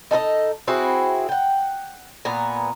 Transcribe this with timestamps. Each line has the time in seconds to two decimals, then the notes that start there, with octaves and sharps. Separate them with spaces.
0.11 D#4 A4 B4 D#5
0.67 C4 E4 F#4 G#4
1.29 F#5 G5
2.25 A#2 B3 G#5 A#5